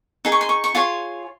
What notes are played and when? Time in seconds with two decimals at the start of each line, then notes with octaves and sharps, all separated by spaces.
0.25 D#4 G#4
0.32 C#6
0.41 C6
0.49 C#6
0.64 C#6
0.75 F4 G#4 C#5 C6